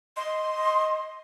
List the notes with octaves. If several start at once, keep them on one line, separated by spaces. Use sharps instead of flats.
D#5 C6